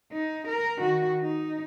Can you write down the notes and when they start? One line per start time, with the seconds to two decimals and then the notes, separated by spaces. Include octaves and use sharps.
0.12 D#4
0.48 A#4
0.78 D#3 F#4
1.21 D#4